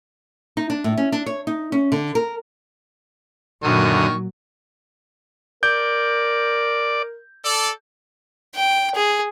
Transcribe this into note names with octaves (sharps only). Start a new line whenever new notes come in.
D#4
D4
A2
C#4
D4
C#5
D#4
C#4
D3
A#4
F#2 A#2 D3 D#3 F#3 C#6 D#6
A#4 D5 G6
A4 D5
G5
G#4